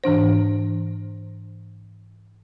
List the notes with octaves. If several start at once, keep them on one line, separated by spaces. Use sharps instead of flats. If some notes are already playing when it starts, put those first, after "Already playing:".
G#2 E3 D4 C5